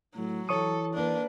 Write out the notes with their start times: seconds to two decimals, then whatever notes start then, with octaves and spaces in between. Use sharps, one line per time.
0.16 A2 F#3
0.49 E3 A4 C#5 C#6 D#6
0.94 A#3 D4 B4